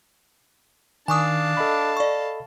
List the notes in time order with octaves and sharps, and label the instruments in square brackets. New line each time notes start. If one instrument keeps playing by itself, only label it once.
[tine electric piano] D#3 [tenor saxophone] D4 [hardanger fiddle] F5 A5 [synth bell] G#5 C#6 D#6
[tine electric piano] A4 D#5 B5
[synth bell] D5 C#6